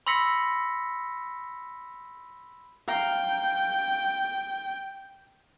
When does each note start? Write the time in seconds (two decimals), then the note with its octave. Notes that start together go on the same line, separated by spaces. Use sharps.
0.07 B5 C6 E6 A#6 B6 C#7
2.88 F5 G5 A#5